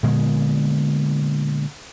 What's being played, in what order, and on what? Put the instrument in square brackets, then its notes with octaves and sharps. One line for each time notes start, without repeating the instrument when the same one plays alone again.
[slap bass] A#2 D3 G#3 B3